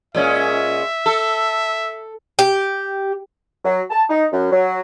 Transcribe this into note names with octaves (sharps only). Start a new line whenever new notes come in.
A#2 G#3 C#4 E5
A4
G4
F#3
A5
D#4
F#2
F#3